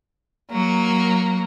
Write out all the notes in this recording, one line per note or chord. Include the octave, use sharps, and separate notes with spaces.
F#3 A#3